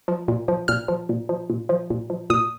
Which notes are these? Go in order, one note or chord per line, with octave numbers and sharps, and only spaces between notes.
F3
A#2
F3
A#2 F6
F3
A#2
F3
A#2
F3
A#2
F3
A#2 D#6